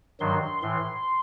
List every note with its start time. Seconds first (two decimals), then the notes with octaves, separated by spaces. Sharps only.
0.20 G2 D#3 F#3 C6
0.62 A2 E3 C6